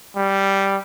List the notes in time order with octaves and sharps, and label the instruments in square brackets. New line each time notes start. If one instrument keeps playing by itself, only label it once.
[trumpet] G3